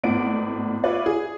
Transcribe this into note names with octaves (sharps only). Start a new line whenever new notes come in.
G#1 A2 B3 D5 D7
F4 B4 C#5 D5 E5
G#4